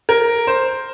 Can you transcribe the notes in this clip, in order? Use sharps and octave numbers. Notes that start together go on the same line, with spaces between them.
A#4
C5